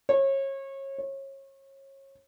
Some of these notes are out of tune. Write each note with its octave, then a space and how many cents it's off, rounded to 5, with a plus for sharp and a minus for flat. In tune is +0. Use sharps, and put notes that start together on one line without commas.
C#5 -30
C#5 -30